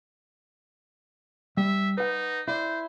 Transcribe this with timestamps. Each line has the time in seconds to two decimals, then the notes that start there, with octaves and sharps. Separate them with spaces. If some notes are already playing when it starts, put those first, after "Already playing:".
1.57 G3 E5
1.97 D#4 B4 F#5
2.48 E4 C5 D5